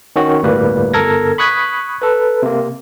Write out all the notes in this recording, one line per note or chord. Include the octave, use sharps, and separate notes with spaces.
D#3 C#4 F#4
G1 D2 A2 G3 A#3 B4
G1 A4 A#4 G#6 A#6
B5 C#6 D#6 F#6 G#6 B6
A4 B4
C3 A#3